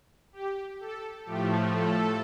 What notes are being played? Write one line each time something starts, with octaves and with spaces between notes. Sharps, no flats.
G4
A4
A2 F3 A3 G4
A4